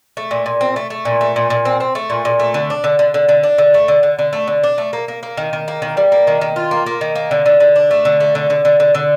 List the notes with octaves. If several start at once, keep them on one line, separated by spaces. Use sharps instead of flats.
A3
A#2
A#2
C4
A3
A3
A#2
A3
A#2
A#2
C4
C4
A3
A#2
A#2
A3
D3
D4
D3
D3
D3
D3
D4
D3
A3
D3
D3
D3
A3
D3
D4
A3
A#3
A#3
A#3
D#3
D#3
A#3
D#3
G3
A#3
D#3
D#3
F4
A#3
A#3
D#3
A#3
D3
D3
D3
D4
A3
D3
A3
D3
D3
D3
D3
D3